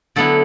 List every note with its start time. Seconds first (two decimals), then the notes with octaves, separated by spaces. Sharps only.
0.16 D3 F#3 B3 E4 A4